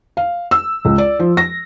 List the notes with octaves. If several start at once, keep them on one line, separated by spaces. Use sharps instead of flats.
F5
E6
C#2
D5
F3
A#6